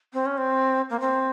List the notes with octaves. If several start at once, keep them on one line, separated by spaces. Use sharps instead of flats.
C4
C#4
C4
A#3
C4